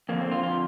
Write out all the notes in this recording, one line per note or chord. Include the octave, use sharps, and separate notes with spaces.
F2 D3 A#3
C4
F4
F4